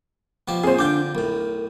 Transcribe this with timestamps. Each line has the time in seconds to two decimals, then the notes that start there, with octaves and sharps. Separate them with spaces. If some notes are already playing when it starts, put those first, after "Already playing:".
0.48 B2 F3 G4
0.64 A#2 F#3 C4 G#4 C5
0.79 D3 D4 F4 G5 D6 G6
1.15 B1 A2 A#4